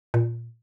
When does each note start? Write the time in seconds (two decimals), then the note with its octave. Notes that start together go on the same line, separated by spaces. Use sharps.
0.14 A#2